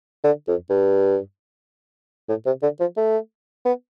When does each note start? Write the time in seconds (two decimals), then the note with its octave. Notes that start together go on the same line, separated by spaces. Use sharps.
0.24 D3
0.48 F2
0.70 G2
2.29 A2
2.46 C3
2.62 D3
2.80 F3
2.97 A3
3.65 B3